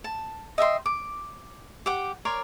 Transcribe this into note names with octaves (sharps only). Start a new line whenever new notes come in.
A5
D#5 E5 G5 C6
D6
G4 F#5 D6
A#4 C#5 D5 C6